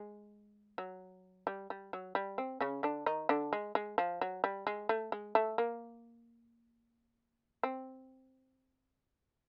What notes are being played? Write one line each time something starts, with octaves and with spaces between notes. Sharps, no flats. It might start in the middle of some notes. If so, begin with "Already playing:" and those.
Already playing: G#3
F#3
G3
G3
F#3
G3
C4
C#3 C#4
D3 D4
D#3 D#4
D3 D4
G#3
G#3
F3
F#3
G3
G#3
A3
G#3
A3
A#3
C4